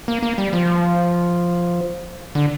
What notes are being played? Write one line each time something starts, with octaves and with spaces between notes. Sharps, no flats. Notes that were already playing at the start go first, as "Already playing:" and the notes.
A#3
A#3
G3
F3
D3